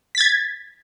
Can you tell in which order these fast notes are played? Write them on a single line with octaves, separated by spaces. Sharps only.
B6 A6 G#6